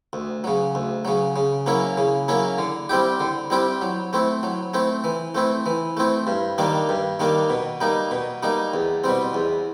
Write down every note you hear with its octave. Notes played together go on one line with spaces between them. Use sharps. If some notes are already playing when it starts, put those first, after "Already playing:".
D2
C#3 F#3
D2
C#3 F#3
C#3
F#3 A#3 C#4 E4
C#3
F#3 A#3 C#4 E4
D3
G3 C4 E4 G4
D3
G3 C4 E4 G4
F#3
A3 C4 E4
F#3
A3 C4 E4
E3
A3 C4 E4
E3
A3 C4 E4
G2
D#3 G3 A#3 D4
G2
D#3 G3 A#3 D4
B2
G3 A#3 D#4
B2
G3 A#3 D#4
E2
B2 G3 C4
E2